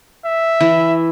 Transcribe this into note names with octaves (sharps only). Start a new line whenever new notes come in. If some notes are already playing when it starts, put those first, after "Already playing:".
E5
E3